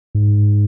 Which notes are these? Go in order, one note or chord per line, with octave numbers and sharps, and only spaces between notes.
G#2